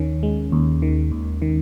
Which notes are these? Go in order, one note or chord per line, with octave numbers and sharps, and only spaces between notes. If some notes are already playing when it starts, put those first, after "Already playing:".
Already playing: D#2 D#3 C#4
G#3
D#2
D#3
D#2
D#3